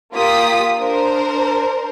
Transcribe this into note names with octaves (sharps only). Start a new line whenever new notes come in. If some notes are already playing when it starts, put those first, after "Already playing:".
A#3 F4 G4 D#6 B6
D4 A#4 C5